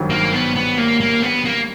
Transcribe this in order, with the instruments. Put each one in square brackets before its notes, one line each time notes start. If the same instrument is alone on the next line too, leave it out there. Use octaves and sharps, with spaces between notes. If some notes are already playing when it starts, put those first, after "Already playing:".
Already playing: [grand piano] G#1 G2 D#3 F#3
[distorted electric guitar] A#3
B3
B3
A#3
A#3
B3
A#3